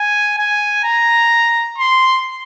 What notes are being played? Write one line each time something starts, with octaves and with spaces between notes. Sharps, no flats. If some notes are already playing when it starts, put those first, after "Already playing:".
Already playing: G#5
G#5
A#5
C6